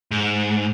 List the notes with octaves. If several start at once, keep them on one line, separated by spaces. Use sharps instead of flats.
G#2